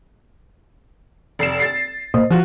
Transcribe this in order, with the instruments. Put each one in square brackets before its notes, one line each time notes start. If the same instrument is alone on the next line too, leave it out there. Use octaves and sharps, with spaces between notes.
[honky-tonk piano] F1 C7 E7
A6 C7
[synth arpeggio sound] A#2 C5 D#5
[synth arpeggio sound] F3 [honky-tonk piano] F4 F#4